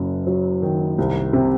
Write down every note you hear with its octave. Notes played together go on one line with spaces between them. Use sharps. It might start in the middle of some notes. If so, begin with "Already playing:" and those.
Already playing: F#1 F#2
F#3
D#3
C2
C3